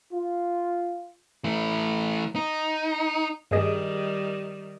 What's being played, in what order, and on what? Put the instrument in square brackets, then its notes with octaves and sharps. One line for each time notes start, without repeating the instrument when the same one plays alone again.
[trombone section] F4
[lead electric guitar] E3 A3
D#4
[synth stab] G2 G#4 D#5 [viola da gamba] D#3 G3